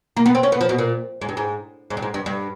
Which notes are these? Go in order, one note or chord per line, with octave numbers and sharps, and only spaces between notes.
A#3
B3
C4
C#4
B3
F3
B2
A#2
G#2
G2
G#2
G#2
G2
G#2
G2
G2